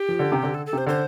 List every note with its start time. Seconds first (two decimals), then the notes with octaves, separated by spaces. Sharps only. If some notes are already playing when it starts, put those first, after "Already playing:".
Already playing: G4
0.08 F3
0.19 D3
0.32 C3
0.43 D3
0.54 A4
0.66 A4
0.73 C3 C5
0.87 D3 C5